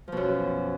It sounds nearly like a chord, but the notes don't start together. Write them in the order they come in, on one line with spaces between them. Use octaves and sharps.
F3 B2 F#2